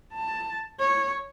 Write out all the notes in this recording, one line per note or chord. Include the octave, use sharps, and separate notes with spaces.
A5
C#5